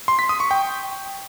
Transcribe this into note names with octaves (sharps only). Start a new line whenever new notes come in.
C6
B6
D#6
C#6
G5